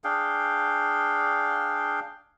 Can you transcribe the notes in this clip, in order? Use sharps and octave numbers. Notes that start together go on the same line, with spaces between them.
D4 G#4 F5 G5